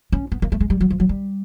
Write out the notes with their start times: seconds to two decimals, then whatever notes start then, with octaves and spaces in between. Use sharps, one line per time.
0.12 C#4
0.32 B3
0.42 A#3
0.52 A3
0.60 G#3
0.70 G3
0.80 F#3
0.90 F3
1.00 F#3
1.09 G3